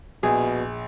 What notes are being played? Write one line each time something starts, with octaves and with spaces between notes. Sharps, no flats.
A#1 B2 G#4